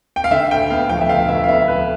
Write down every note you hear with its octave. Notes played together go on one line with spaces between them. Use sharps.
G5
F5
D3 E5
D2 G5
B3 F5
F3 G5
E5
D3 F5
D2 E5
F5
B3 E5
F3 B4